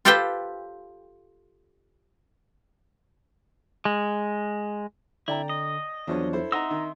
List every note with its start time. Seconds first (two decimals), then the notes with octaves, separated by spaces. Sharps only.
0.05 F4 G4 A4 B4 C5 G5
3.85 G#3
5.28 D3 E4 D5 G5 A#5
5.49 D#5
6.07 E2 F3 F#3 D4 C#5
6.33 E4 A4 C5
6.52 D#4 E5 F#5 A#5 C6 D#6 E6 A#6
6.70 D#3